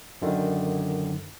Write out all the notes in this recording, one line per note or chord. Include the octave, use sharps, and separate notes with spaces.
F#2 D3 D#3